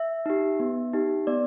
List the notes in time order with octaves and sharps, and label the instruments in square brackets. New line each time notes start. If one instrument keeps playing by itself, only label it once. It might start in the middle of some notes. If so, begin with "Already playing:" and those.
Already playing: [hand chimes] E5
D#4 G4
B3
D#4 G4
B3 D5